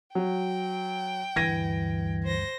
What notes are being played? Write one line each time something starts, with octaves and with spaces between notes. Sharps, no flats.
F#3 G5
D2 G2 E3 G#6 A#6 D#7
C5 A#6